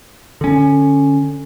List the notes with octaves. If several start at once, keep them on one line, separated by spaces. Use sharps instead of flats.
D3 C#4